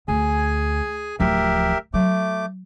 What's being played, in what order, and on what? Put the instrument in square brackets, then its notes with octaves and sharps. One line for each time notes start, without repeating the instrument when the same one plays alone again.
[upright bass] D2 [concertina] G#4 G#5
[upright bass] D1 F3 [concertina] G4 A#4 E5
[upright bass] F#3 [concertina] A3 D6